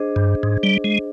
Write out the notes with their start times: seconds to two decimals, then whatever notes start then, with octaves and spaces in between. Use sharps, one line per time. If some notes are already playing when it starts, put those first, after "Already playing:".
Already playing: D4 G#4 C5 D#5
0.16 G2
0.43 G#2
0.63 G3
0.84 G#3